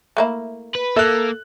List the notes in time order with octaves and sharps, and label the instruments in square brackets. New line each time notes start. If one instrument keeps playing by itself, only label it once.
[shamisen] A3 A#3 E4
[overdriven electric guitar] B4
[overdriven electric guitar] A#3 [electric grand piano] A4 F#6 [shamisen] E5